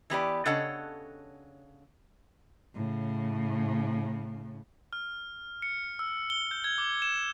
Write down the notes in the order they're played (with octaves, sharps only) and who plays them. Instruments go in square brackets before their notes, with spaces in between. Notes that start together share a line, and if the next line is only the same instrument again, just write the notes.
[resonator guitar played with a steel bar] E3 B3 G4 D5
C#3 D4 A4 C#5 D#5 F#5
[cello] A2 C#3
[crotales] F6
C#7
E6
G7
G6
G#6
D6
E7